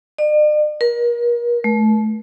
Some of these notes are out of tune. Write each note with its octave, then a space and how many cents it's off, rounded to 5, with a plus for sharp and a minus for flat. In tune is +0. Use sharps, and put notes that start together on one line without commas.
D5 +45
A#4 +35
A3 -30